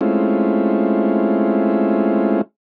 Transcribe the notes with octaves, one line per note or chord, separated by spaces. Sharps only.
G#3 A3 C4 C#4 E4 F4